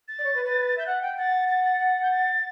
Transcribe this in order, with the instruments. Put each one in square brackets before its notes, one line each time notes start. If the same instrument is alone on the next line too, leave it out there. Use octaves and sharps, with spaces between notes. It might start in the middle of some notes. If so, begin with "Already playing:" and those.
[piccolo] A6
[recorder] D5
C#5
B4
B4
[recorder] E5 [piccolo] G6
[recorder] F#5 [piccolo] F#6
[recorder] G5 [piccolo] G6
[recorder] F#5 [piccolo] A6
[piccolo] A6
A6
G6
A6